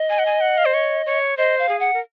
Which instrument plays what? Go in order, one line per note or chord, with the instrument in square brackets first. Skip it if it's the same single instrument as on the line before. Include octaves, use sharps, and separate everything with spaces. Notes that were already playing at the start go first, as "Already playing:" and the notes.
Already playing: [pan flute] D#5
[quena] G#5
F#5
G#5
F#5
F5
C5
C#5
C#5
[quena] C5 [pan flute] D#5
[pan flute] F5
[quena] G#4
[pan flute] F#5
[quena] A#4